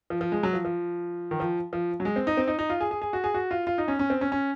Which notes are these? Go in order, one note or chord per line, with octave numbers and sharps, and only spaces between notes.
F3
F3
G#3
F#3
F3
F3
D#3
F3
F3
F#3
G#3
C4
D#4
C4
D#4
D#4
F4
G#4
G#4
G#4
F#4
G#4
F#4
F4
F4
D#4
C#4
C#4
C4
C#4
C#4